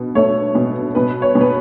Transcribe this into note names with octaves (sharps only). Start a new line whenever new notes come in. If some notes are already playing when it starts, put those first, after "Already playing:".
Already playing: B2
A3 C#5
B2
B2 B4
C#5
B2
B4